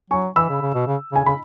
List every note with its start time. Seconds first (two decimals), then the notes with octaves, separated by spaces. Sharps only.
0.10 F#3 G#5 C#6
0.36 E3 B5 E6
0.49 C#3
0.62 C#3
0.74 B2
0.87 C#3
1.12 C#3 G#5
1.25 C#3 B5